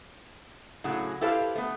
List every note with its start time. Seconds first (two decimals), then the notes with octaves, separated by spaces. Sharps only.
0.84 A2 C#3 F#3 G#4 F#5
1.21 E4 G4 A4 B4 C5 F5
1.55 A3 B3